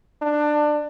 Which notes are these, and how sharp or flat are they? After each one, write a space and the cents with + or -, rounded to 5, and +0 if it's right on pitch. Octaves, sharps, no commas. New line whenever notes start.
D4 +20